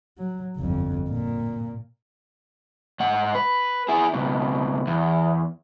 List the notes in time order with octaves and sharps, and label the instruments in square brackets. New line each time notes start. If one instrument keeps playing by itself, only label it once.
[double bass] F#3
G1 F2
A#2
[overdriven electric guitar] G#2 F#5
B4
E4 G#4
C#2 B2
E2